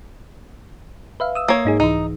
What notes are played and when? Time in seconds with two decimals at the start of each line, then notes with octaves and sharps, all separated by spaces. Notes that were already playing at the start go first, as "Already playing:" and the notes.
1.20 B4 E5 F5
1.35 D#6 E6
1.48 A#3 C#5
1.65 G#2 D#4 G#4
1.80 C2 E3 D#4